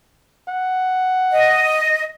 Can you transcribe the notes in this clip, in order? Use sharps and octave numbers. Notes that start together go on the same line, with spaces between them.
F#5
D#5